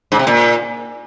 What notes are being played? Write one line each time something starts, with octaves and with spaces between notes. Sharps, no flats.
G#2
C3
A#2